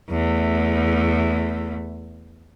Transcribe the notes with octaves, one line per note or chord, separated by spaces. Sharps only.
E2 A3